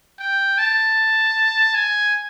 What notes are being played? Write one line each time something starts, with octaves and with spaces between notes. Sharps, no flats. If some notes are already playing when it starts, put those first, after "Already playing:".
G5
A5
G#5